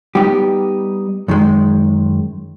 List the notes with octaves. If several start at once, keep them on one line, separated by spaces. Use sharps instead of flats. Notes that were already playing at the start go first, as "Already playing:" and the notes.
G3 B3 D#4 G4
F#2 D#3 G#3